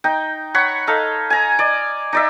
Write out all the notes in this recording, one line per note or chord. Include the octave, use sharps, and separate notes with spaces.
D#4 G5
C#5 F#5 B5 C#6
D#4 A4 F5
G#5 A#5
D5 D#5
D#4 D5 E5